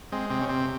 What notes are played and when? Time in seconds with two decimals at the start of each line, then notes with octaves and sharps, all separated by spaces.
0.12 G#3 C4
0.30 C3 C4
0.41 C#4
0.49 C3 C4